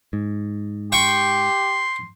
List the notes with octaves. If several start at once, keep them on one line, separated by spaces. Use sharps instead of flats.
G#2
G4 G5 C6 C#6